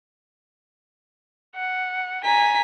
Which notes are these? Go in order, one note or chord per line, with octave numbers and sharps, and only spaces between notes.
F#5
G#5 A#5 B6